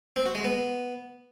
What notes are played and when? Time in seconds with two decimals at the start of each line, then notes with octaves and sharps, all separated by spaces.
0.16 C4
0.26 F#4
0.35 G#3
0.44 B3